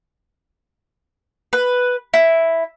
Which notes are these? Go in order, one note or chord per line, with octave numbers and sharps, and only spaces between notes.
B4
E4